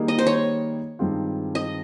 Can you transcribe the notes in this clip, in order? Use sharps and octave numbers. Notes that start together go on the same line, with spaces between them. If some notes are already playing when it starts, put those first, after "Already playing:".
Already playing: D#3 G3 A#3 D#4 G#4
D#5
C5
C#5
G2 D#3 G#3 C4 F4
D#5